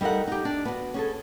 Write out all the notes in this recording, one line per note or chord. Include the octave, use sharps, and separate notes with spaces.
G3 D#4 A4 A#4 F#5
D#4 G4
D4
B3 F#4
C#4 G#4 A4